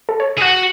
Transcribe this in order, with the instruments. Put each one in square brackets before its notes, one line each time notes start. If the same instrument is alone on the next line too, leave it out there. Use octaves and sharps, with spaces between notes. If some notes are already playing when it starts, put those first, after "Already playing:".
[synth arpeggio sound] A4
C#5
[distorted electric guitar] G#4
[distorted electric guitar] F#4 [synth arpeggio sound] F#5